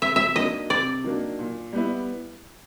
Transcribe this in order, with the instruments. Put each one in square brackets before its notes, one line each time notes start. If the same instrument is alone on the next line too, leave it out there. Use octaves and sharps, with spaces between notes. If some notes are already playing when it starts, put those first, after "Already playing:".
[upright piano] C3 [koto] E5
[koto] E5
[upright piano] D#3 F#3 A#3 D4 [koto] D#5
[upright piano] C3 [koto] D5
[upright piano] D#3 F#3 A#3 D4
A#2
G3 B3 E4